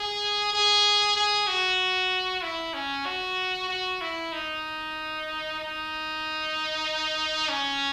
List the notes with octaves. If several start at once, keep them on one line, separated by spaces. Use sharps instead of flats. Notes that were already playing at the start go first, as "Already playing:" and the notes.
Already playing: G#4
G#4
G#4
F#4
E4
C#4
F#4
F#4
E4
D#4
D#4
C#4